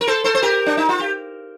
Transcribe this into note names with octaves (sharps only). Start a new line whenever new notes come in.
A#4
A4 C5
A4 C5
C5
G4 A#4
D4
D#4
F4
G4